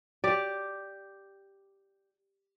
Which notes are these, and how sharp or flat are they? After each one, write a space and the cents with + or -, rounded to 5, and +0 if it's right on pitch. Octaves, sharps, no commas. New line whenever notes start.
G4 +0 D5 +0